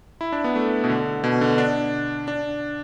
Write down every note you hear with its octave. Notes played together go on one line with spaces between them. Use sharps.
E4
D4
B3
A3
B2
D3
B2
D3
D4
D4